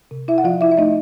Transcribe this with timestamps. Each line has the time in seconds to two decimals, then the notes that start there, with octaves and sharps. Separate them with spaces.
0.11 C3
0.28 E4 E5
0.38 F#5
0.44 F3 F4 F5
0.61 E4 E5
0.72 E5
0.77 A3 D#4 D#5